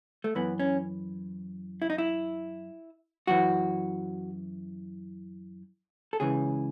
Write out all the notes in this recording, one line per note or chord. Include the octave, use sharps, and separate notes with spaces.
A3
F#2 E3 B3
C#4
E4
D#4
E4
F#2 E3 F#4
A4
C#2 C#3 E3 G#4